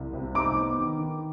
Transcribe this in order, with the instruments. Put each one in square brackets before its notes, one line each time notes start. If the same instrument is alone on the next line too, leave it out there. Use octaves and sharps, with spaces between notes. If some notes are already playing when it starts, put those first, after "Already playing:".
Already playing: [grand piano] C2
C3
[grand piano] D#4 [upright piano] D6
[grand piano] B3
D#3
D#3